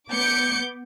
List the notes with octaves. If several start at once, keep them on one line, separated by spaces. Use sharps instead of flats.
B3 D6 G6 C#7